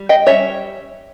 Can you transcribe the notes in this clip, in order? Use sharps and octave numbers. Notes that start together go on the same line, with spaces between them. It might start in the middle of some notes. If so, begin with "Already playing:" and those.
Already playing: G3
D#5 G5
G3 C#4 C#5 E5